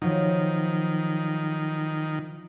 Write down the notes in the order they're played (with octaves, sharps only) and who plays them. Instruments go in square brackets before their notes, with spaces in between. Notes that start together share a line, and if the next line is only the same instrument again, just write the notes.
[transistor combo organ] D#3 [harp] F3 F#3